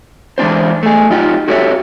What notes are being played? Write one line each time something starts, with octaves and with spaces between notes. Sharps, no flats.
E3 G#3 D4 D#4 C5
A3 G#4
F#3 D#4 F4 G4
F#4 G4 A4 C#5 D5 E5